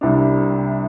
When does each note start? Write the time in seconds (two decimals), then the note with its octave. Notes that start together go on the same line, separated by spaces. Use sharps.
0.01 C2 C3 G3 D4